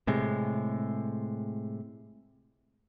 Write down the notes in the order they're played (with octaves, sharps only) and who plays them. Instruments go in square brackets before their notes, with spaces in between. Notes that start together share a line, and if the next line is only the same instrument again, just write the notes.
[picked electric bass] A2 C3 G#3